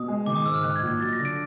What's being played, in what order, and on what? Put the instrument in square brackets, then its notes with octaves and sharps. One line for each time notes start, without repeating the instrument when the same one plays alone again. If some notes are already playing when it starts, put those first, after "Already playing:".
Already playing: [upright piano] B2 [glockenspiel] D#6
[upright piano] G#3
[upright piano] D#3 [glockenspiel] D6
[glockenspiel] D#6
[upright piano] G#2 [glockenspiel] E6
[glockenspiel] F6
[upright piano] D#3 [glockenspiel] F#6
[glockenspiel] G#6
[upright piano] A#1
[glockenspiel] G#6
[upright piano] F#3 [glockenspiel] A6
[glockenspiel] A#6
[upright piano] D3
[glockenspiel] D7